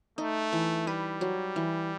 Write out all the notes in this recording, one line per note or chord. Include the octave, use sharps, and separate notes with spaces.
A3 D#4
E3
G3 B4
F#3
E3